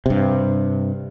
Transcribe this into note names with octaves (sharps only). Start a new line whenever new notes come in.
G2 C3